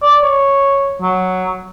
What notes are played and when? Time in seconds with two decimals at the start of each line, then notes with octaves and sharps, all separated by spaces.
0.02 D5
0.23 C#5
1.02 F#3